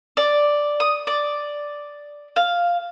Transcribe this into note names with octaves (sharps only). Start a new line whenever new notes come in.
D5
D#6
D5
F5